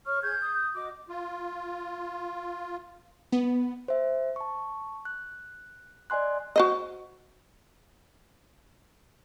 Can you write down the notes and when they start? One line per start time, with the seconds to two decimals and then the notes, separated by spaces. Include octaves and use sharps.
0.06 C#5 C#6 F6
0.22 G#4 G6 G#6
0.41 D#6
0.75 F#4 D#5 D6
1.09 F4
3.32 B3
3.88 C5 E5
4.36 A5 C#6
5.05 F#6
6.10 D5 D#5 G#5 C6 F#6
6.56 F#4 C5 D#5